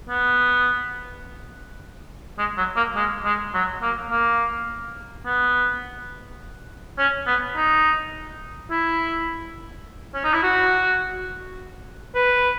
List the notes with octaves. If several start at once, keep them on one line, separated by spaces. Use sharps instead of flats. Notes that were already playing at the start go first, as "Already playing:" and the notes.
B3
G#3
F#3
A#3
G#3
G#3
F#3
A#3
A#3
B3
C#4
B3
D#4
E4
C#4
D#4
E4
F#4
B4